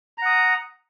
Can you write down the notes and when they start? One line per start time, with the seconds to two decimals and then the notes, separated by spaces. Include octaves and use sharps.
0.18 A#5
0.22 F#5
0.26 D#6